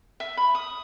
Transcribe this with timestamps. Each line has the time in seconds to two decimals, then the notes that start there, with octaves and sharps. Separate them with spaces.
0.20 E5
0.37 B5
0.55 D#6